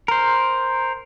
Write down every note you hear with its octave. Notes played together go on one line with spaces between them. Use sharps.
A#4 C5